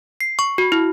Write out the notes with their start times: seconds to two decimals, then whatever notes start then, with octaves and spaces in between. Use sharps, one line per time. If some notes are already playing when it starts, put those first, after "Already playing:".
0.21 C7
0.39 C#6
0.58 F#4
0.72 E4